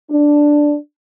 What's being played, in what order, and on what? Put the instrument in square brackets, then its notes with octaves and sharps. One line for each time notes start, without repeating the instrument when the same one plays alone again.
[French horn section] D4